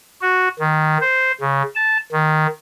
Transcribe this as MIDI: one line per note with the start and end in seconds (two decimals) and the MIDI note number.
0.21 0.48 66
0.59 0.98 51
1.01 1.32 72
1.40 1.62 49
1.75 1.98 81
2.12 2.47 51